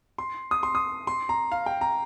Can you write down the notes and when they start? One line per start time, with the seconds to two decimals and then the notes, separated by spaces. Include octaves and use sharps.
0.18 C6
0.51 D#6
0.63 C6
0.75 D#6
1.07 C6
1.29 A#5
1.52 F5
1.66 G5
1.81 A#5